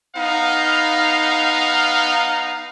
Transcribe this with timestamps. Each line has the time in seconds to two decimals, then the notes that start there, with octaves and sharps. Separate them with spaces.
0.16 B3 D#4 F5